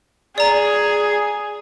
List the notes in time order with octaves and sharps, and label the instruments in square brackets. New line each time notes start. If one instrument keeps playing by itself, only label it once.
[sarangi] G#4 [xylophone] D5 A#5